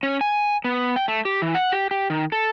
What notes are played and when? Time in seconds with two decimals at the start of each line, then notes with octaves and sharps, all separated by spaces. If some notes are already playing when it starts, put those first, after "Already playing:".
0.03 C#4
0.21 G#5
0.64 B3
0.96 G5
1.08 A3
1.25 G4
1.42 E3
1.55 F#5
1.72 G4
1.91 G4
2.10 D#3
2.32 A4